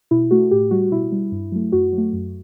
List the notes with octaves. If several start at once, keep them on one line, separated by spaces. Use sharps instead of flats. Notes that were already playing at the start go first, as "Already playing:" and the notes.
B2 E4
A3 F#4
A2 G4
G3 F#4
B2 E4
G3
G2
F#3 A3
F#2 F#4
F#3
A3
F#2